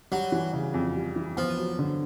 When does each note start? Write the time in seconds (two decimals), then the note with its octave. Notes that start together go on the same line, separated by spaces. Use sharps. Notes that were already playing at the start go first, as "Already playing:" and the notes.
0.11 F#3 G3
0.32 E3
0.53 C#3
0.74 F2
0.95 G3
1.16 E3
1.37 F3 B3
1.58 F#3
1.79 D3